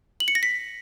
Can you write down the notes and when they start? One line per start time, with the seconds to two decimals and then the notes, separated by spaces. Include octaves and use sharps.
0.20 F#7
0.28 C#7
0.35 A#6
0.43 B6